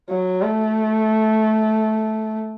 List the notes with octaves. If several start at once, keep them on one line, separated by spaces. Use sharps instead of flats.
F#3
A3